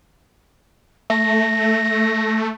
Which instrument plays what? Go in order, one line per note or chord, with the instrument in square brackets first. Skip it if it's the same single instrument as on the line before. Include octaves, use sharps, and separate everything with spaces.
[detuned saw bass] A3 [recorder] A#6